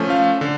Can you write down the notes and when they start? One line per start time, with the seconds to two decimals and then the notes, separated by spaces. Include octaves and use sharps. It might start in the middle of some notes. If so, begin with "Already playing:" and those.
Already playing: F3 A3 C#4
0.10 F5
0.41 D3